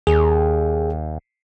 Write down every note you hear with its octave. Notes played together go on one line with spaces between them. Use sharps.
D#2 G#4